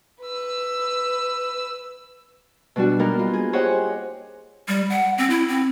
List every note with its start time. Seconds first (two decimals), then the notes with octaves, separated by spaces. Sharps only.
0.22 B4 E6
2.76 B2 G3 D4 F#4
2.99 G3 A#3 B3 D#4 A#4
3.19 F4
3.33 G#4
3.53 G4 G#4 C5 C#5 D#5 F#5
4.68 G3
4.90 F#5
5.18 C4
5.30 E4
5.48 C4